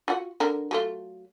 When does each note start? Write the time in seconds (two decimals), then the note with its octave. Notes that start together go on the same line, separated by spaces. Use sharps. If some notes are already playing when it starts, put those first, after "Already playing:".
0.08 F4 F#4 F#5
0.40 D3 A#4
0.71 F#3 A3 F4